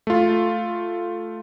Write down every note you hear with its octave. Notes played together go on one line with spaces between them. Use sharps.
A3 F4